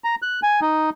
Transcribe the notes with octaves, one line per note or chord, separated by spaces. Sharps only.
A#5
F#6
G#5
D#4